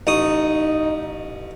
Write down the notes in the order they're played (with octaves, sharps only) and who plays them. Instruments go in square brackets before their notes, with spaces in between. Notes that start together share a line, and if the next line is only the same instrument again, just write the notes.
[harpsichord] A1 C#6 D#6 [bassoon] D#4